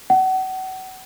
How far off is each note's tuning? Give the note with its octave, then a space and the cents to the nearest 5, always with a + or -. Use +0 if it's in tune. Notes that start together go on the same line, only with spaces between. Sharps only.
F#5 +35